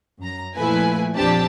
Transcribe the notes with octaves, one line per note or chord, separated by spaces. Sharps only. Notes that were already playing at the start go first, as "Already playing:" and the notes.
F#2 A#5
A#2 F3 A3 E4 B4 G#5
A#1 F2 C4 D4 G4 A5